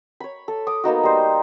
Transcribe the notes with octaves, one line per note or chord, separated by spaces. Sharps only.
C#5 B5
A4
D6 D#6
A#3 B3 D#4 F#4
G3 C5